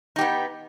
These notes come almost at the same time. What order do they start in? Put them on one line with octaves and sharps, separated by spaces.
D#4 G4 B3